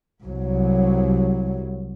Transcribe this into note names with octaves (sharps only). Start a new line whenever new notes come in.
C2 F#3